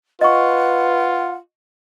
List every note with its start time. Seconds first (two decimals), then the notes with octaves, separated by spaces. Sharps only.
0.21 F4 B4 D#5 F#5 C#6